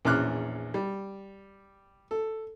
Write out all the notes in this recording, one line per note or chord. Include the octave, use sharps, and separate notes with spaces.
A#1 E2 C#4 D6 F6 F#6
G3
A4